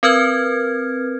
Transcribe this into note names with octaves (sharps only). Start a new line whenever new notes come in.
C4 A#4 B4 F6 G#6